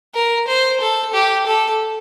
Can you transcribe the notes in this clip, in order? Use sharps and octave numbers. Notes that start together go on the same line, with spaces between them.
A#4
C5
A4
G4
A4